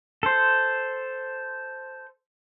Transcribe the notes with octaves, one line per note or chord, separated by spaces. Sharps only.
A4 C5